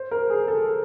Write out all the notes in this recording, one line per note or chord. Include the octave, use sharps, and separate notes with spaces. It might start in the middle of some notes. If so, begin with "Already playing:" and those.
Already playing: C5
A#4
G#4
A4